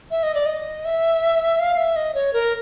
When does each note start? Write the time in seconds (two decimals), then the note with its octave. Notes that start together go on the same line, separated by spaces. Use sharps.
0.11 E5
0.23 D#5
0.35 D5
0.46 D#5
0.85 E5
1.59 F5
1.77 E5
1.96 D#5
2.14 C#5
2.33 A#4